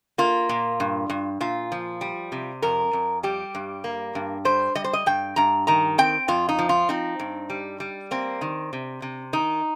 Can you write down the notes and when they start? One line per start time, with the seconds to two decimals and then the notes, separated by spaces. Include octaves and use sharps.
0.18 A#3 F4
0.49 A#2
0.80 G2
1.10 G2
1.40 A#2 F4
1.72 F3
2.01 G3
2.32 C3
2.62 F2 A#4
2.93 F2
3.23 G3 G4
3.55 G2
3.84 A#3
4.15 G2
4.45 G3 C5
4.75 G3 D#5
4.84 C5
4.93 D#5
5.06 G2 G5
5.36 G2 A#5
5.67 D#3 A#5
5.98 C4 G5
6.28 F2 F4
6.49 D#4
6.59 F3
6.69 F4
6.89 C4 D#4
7.20 G2
7.50 G3
7.80 G3
8.11 A#3 C4
8.41 D#3
8.73 C3
9.02 C3
9.33 D#3 D#4